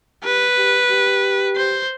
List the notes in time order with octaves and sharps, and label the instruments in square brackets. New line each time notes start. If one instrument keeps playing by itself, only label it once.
[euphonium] G4 [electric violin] B4
[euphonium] G4
G4
[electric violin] C5